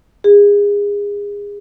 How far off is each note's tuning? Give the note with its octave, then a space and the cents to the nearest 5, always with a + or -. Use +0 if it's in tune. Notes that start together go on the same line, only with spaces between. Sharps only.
G#4 -30